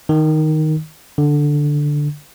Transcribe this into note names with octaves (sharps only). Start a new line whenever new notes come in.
D#3
D3